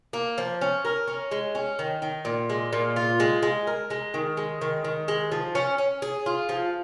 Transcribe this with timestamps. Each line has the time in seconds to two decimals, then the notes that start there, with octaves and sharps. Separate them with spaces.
0.13 A#3
0.38 F3
0.61 C#4
0.85 A#4
1.07 C#4
1.31 G#3
1.55 C#4
1.79 D#3
2.02 D#3
2.25 A#2
2.50 G#3
2.73 A#2
2.96 F4
3.20 G#3
3.43 G#3
3.67 A#4
3.90 G#3
4.14 D#3
4.37 G#3
4.61 D#3
4.85 D#3
5.08 G#3
5.32 F3
5.55 C#4
5.78 C#4
6.02 G#4
6.26 F4
6.49 F3